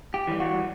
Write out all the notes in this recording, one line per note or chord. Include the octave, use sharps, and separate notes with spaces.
G4
E3 G3
F#4